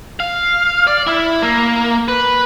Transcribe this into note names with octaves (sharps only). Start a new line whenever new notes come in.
F5
D5
E4
A#3
B4